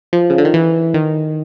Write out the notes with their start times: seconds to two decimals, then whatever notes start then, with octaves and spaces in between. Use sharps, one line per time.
0.13 F3
0.30 C#3
0.38 D3
0.45 D#3
0.54 E3
0.94 D#3